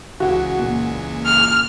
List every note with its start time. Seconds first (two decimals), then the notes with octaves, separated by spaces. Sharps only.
0.20 C#2 C#3 E3 F#4
0.59 A#2
1.26 F6